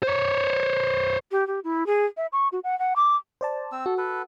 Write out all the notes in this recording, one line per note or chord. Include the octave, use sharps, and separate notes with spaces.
C5 C#5
G4
G4
E4
G#4
E5
C#6
F#4
F#5
F#5
D6
C5 D5 A5
C4 E6
F#4 A4
A4 B4